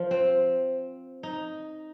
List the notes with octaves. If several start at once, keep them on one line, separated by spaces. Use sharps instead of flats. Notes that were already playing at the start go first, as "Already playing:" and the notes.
Already playing: F3
C4
D#4